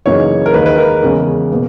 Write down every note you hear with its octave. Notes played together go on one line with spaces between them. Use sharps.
F#2 C#3 E3 A#3 D#4 C#5
A#4
D#2 D#3 G#3 D#4 B4
B4
A#4
E2 C#3 G#3 C#4
B2 A#3